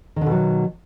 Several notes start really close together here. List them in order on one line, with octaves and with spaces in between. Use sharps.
D#3 D3 B2 F#3